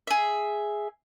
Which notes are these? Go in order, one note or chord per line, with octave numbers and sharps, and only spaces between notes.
G#4 E5